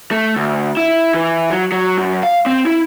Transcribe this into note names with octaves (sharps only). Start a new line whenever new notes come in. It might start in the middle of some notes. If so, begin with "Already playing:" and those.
A3
D2
E4
E3
F#3
F#3
F#2
F5
C4
E4